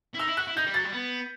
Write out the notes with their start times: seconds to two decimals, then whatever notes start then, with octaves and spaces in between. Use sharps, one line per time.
0.15 E4
0.19 D#4 E6
0.28 E4
0.37 F#4 F#6
0.48 E4
0.57 D#4 G6
0.66 G3
0.74 F#3 A6
0.84 G3
0.93 B3